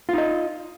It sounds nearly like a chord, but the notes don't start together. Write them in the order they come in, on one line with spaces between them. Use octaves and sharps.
F4 D#4 D#5